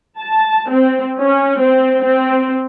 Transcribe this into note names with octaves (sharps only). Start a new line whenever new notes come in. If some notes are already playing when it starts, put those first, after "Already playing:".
A5
C4
C#4
C4
C4